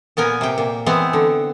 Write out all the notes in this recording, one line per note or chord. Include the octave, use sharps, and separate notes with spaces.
A#2 B3 A#4 G#5
C3 G5
A#2
E3 G#3 B3 C4
D3